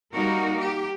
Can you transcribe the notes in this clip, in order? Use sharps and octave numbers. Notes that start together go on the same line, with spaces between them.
G3 A#3 D#4 F#4 A#4
G4